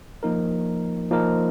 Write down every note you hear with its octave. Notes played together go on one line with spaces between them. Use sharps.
F3 A#3 D#4 A#4
F3 A#3 D#4 A#4